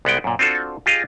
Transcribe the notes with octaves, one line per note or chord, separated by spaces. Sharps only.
C2 G#3 B3 F#5 G5
F#2 A#2
C4 D4 F4 F#4 A4
F4 G4 G#4 D#5 F5